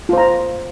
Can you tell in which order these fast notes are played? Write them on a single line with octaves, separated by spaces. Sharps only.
F4 C5 A#5